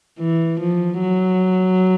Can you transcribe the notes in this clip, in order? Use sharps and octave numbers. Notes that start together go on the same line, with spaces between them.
E3
F3
F#3